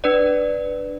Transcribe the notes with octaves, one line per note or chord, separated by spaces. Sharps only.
D4 B4 D5